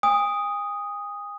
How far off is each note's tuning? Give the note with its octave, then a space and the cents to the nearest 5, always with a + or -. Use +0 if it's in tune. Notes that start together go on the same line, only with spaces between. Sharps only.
G#5 -40 D#6 +0